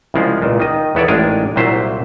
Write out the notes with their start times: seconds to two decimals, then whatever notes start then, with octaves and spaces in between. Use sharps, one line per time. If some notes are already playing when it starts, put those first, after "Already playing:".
0.14 C2 C#3 F3 G#3
0.42 C#2 A#2
0.60 D#3 D#5
0.95 E2 B3 A4 C#5 D5
1.08 A1 D#3 G#3 D4 A#4 G#5
1.56 C2 A#2 F#3 C5 E5